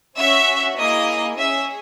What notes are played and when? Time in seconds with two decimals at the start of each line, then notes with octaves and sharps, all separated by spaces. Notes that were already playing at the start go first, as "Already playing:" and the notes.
0.17 C#4 F#4 E5
0.78 A#3 E4 G#4 D#5
1.38 C#4 G#4 E5